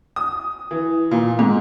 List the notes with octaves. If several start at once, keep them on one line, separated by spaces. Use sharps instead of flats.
D#6
E3
A#2
G#2